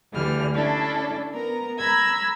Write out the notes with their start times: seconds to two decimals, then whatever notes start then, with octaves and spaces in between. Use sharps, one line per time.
0.13 D2 D3 E3 G3 F6
0.54 C#4 D4 E4 A4 D5
1.33 B3 A#4 A#5
1.78 A#5 B5 E6 G#6